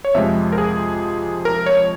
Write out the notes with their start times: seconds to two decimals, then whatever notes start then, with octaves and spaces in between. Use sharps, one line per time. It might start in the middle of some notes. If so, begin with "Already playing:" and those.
0.05 C#5
0.14 F2 C3 F3 G#3 E5
0.52 A#4
0.58 G#4
1.45 A#4
1.66 C#5